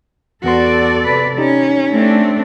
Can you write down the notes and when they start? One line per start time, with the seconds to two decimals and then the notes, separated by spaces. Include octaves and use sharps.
0.44 E2 B3 F#4 A4 D5 C6
1.05 C3 B4
1.38 C#4 D#4 G4
1.90 A3 C4 D4